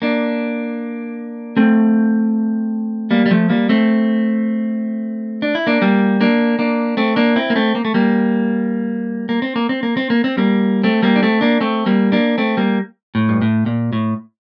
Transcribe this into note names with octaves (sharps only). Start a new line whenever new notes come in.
A#3 D4
A3 C4
G3 A#3
G3
F3 A3
G3 A#3
A3 C4
D4
E4
A#3 D4
G3 A#3
A#3 D4
A#3 D4
A3 C4
A#3 D4
C4 E4
A#3
A3 C4
A#3
A3
G3 A#3
A#3
C4
A#3
C4
A#3
C4
A#3
C4
G3 A#3
A3 C4
G3 A#3
D4
A3 C4
A#3 D4
A3 C4
G3 A#3
A#3 D4
A3 C4
G3 A#3
A2
G2
A2
A#2
A2